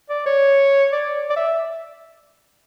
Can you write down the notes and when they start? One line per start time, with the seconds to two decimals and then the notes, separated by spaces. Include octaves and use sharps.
0.10 D5
0.26 C#5
0.92 D5
1.30 D5
1.36 E5